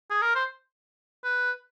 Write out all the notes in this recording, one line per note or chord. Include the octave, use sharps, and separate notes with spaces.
G#4
A#4
C5
B4